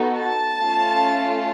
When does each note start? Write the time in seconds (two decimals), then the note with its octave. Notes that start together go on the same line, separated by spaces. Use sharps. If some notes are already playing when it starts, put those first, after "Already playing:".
Already playing: B3 D#4 F#4 A4
0.19 A5
0.61 A3 C#4 F4